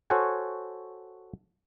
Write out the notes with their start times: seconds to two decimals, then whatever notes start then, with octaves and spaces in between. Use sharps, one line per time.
0.10 F#4 A4 C5 C#5 F#5 G#5